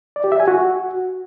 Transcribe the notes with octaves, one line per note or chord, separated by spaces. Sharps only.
D5
G4
E5
G#5
F#4